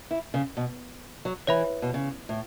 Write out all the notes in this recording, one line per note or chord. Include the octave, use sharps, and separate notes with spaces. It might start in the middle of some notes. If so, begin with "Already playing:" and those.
E4
C#3
B2
F#3
E3 C#5 E5 B5
B2
C#3
A2